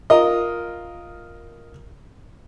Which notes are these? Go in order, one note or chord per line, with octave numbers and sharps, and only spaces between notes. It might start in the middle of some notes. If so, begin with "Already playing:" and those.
F4 A#4 D#5